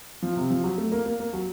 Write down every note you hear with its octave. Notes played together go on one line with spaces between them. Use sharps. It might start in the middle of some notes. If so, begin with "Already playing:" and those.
F3
C3
F3
F#3
A3
A#3
A#3
A#3
F#3